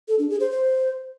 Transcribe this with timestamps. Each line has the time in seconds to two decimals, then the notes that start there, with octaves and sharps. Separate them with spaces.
0.08 A4
0.19 D4
0.30 G#4
0.40 C5
0.51 C5